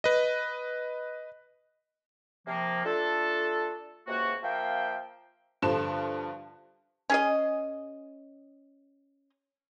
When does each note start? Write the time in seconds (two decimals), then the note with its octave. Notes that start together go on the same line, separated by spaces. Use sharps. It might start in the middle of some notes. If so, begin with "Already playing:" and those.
0.04 B4 D#5
2.47 C3 F3 A#3
2.85 A3 D4 F4 A4
4.08 C#2 C3 A#3 F#4
4.43 F3 A#3 E5 G5
5.62 G2 D3 F3 C6 E7
7.10 C#4 G#4 D#5